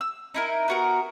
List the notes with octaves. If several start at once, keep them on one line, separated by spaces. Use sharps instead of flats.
E6
D#4 E4 A#4
B3 F#4 A#4